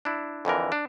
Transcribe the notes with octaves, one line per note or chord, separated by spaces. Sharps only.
D4 E4
F2 D3 E3 A#4
D4